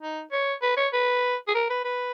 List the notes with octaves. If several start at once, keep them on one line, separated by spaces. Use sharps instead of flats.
D#4
C#5
B4
C#5
B4
G#4
A#4
B4
B4